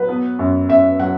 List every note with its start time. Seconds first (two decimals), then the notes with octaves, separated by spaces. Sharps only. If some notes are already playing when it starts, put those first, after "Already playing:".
Already playing: F#3 B4
0.09 B3
0.39 F#2
0.69 F#2 E5
0.99 F#3 F#5